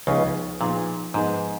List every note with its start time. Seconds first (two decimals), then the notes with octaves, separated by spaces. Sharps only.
0.07 C#2 C#3 F3 B3 D#4 G#4 B4
0.61 A#2 F3 B3 D#4 G#4 B4
1.14 G#2 F3 B3 D#4 G#4 B4